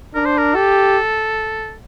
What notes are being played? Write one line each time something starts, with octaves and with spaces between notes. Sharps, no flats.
D4 A#4
C5
A#4
G4 A4